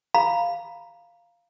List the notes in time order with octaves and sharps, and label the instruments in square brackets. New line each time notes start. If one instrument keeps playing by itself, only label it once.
[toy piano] F5 A#5 B5